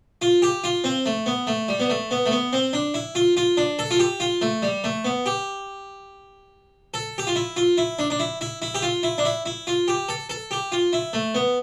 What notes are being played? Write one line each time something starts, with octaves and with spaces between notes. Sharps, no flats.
F4
G4
F4
C4
A3
B3
A3
G3
B3
A3
B3
A3
B3
C4
D4
E4
F4
F4
D4
A4
F4
G4
F4
A3
G3
A3
B3
G4
A4
G4
F4
E4
F4
E4
D4
D4
E4
E4
E4
G4
F4
E4
D4
E4
E4
F4
G4
A4
A4
G4
F4
E4
A3
B3